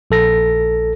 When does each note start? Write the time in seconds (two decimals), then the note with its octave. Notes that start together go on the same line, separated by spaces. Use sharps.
0.11 A#1 A4 A#6